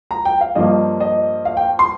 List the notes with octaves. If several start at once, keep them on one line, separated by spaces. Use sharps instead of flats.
A#5
G5
F5
G2 F3 A#3 D#5
D#5
F5
G5
C6